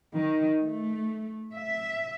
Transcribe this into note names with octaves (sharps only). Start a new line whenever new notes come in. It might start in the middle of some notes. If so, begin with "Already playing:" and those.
D#3
A3
E5